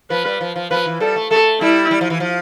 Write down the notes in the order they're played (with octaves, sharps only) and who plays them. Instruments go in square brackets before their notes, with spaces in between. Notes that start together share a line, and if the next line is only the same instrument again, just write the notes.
[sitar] F3 [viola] B4
[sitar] G3
F3
F3
[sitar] F3 [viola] B4
[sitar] E3
[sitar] G3 [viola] A4
[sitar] A3
[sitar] A3 [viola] A4
[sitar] G3 [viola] E4
[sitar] G3
F3
E3
F3